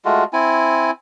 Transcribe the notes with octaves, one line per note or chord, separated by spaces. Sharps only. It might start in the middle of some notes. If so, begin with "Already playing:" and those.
G#3 A3 F4 F#4
C4 E4 G#5